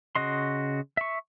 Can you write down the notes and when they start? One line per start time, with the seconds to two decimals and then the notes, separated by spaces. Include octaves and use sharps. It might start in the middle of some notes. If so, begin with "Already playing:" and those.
0.15 C#3 F#4 D#5 C6
0.97 E5 C#6